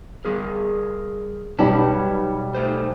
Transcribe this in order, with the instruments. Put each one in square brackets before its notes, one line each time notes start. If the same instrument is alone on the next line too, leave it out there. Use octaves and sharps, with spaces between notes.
[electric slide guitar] G3 G#4 A#4
[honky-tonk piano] B1 G3 [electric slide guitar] B4 C#5 A5
[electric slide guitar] A3 C5